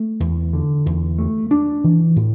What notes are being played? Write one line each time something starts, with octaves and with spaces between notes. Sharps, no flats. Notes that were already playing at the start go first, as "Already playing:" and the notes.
Already playing: A3
E2
D3
E2
A3
D4
E3
A2